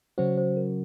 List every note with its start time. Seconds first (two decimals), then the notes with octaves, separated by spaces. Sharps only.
0.18 C#3 F#3 C#4 F#4 C5
0.38 C5
0.57 A#4